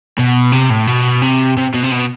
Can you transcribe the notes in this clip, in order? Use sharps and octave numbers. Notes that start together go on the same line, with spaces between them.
B2
C3
A2
B2
C3
C3
B2
C3
B2